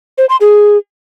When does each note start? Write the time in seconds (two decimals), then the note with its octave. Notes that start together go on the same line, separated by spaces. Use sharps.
0.18 C5
0.29 C6
0.41 G#4